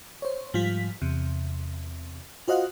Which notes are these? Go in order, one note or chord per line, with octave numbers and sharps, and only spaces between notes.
C5 C#5
G#2 F3 G3 F4 B6
E2 C3
F4 F#4 C5 D#5 F5 F#5